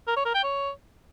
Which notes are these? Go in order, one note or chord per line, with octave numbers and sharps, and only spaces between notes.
A#4
C#5
A#4
G5
C#5